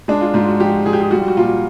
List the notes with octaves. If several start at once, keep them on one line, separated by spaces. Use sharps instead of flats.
G#3 D4
F4
G#2 F4
F#4
F3 G4
F3 G#4
G4
G#4
G3 F#4
F4
F#4
A#2 F4